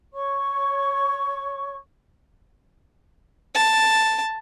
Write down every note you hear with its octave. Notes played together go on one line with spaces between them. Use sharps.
C#5 C#6
A5